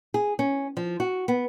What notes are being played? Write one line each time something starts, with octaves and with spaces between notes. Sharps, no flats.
G#4
C#4
F3
F#4
B3